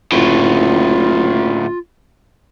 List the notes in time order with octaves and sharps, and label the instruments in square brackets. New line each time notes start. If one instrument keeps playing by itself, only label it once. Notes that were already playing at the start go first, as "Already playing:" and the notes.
[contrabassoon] F#1 [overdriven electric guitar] D2 A2 [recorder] F4